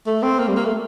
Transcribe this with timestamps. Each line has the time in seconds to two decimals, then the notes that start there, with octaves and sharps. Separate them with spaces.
0.07 A3
0.23 C4
0.39 A#3
0.48 G3
0.56 A#3
0.65 A3